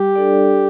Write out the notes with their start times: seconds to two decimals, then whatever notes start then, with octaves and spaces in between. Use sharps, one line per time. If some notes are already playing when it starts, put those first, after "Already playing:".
Already playing: G3 G4
0.15 D4 A4 D5